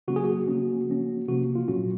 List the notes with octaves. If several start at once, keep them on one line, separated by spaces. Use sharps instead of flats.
C#3 F#3 A#3 C#4 F#4
G#4
F#4
C#3 F3 A#3 C#4
F3 A#3 C#4
C3 F3 A#3 C#4 F#4
F4
A#2 F#3 C#4 F#4